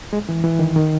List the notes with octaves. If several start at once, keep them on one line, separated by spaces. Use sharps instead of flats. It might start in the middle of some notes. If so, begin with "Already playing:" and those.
G#3
E3
E3
D#3
D#3